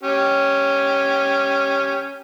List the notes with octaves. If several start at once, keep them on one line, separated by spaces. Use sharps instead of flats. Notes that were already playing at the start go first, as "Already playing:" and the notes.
C#4 G4